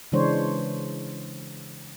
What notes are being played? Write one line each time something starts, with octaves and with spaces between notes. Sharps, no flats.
C#3 E3 G#3 D4 C5 C#5